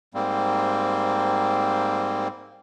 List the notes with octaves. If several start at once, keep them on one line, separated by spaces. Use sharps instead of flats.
G#2 G3 A#3 C4